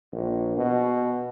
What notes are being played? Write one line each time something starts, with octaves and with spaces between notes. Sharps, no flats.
A#1
B2